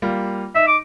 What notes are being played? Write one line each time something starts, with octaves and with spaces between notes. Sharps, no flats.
G3 A#3 F4
D#4 E5
D6